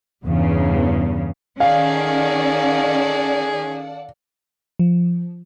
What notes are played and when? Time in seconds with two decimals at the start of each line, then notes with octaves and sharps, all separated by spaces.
0.24 E2 G2 C#3
1.60 D#3 C#4 G#4 A4 D5 F5 F#5
4.79 F3